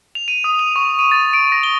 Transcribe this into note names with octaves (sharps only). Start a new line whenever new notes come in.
F7
D#7
D#6
F7
C#6
D#7
A6
D7
A#6
G7